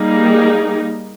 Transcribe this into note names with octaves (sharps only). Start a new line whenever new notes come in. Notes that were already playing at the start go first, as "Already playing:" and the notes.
Already playing: G3 A#3 D#4 G#4